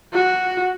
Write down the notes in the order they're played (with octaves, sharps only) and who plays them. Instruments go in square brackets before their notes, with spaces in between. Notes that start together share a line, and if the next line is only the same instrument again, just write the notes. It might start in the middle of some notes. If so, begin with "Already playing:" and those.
[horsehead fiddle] F#4